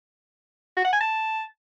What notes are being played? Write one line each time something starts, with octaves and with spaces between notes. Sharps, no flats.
F#4
F#5
G#5
A5